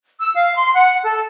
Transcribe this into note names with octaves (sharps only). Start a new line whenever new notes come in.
E6
F5
C6
F#5
A4